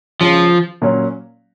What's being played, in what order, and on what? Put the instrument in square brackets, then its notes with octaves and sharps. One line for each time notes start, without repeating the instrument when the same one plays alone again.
[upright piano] C#3 G#3 C#4 [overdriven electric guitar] F3
[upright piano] A#2 F#3 A#3 C#4